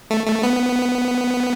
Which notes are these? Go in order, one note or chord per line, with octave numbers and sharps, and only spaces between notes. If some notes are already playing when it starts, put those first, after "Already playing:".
A3
A3
B3